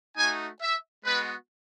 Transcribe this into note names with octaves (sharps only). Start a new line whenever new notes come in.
A3 D#4 F#4 G#5
E5
G#3 B3 F#4 B4